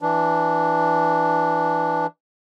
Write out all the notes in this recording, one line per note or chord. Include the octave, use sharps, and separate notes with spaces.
E3 D4